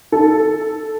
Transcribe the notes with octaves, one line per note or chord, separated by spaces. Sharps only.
D#4 A4